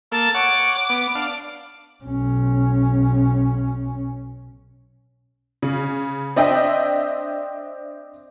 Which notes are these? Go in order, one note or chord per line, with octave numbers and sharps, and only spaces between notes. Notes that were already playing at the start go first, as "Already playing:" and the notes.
A#3 A4 A5
C#5 F#5 D6
B3
D4 F5
B1 C#4
C#3
C4 D4 D#5 E5 G5